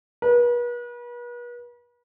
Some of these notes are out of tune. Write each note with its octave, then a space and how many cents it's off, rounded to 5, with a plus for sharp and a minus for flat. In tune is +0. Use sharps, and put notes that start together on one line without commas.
B4 -40